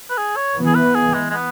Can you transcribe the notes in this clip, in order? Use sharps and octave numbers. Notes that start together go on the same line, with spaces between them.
B4
G#4
C#5
E3 B3
G#4
B4
G#4
G#3
G#3
B3